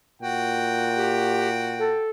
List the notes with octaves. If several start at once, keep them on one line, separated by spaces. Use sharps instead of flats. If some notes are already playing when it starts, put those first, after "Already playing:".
A#2 F#4 G5
G4
A4